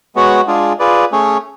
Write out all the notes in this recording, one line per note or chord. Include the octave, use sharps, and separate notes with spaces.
G#3 B3 F#4 C#5 F#5
G#3 D4 F4 G#4
F4 G#4 B4 D5
A3 C#4 G#4 C#5